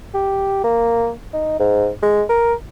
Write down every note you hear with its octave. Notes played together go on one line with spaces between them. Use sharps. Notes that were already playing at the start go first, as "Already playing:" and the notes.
G4
A#3
D#4
G#2
G#3
A#4